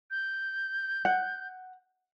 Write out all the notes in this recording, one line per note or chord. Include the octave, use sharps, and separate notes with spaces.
G6
F#5